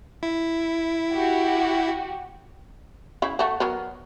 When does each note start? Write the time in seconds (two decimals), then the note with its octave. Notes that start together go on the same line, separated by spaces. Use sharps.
0.23 E4
1.12 F#4 G4
3.22 C#3 E4
3.39 A3 F#4
3.60 F#3 B3 A#4